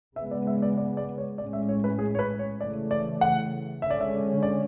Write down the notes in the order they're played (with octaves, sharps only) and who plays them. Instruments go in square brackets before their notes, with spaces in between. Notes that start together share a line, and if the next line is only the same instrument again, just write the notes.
[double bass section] C#3 G#3 B3 [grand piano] E5
[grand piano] D5
E5
D5
D5
D5
C#5
[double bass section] A2 G#3 C#4 [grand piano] D5
[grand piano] E5
C#5
B4
G#4
C#5
B4
C#5
[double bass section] C#3 E3 A3 [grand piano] D5
[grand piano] D5
F#5
[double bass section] D3 G#3 C#4 [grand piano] E5
[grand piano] D5
E5
D5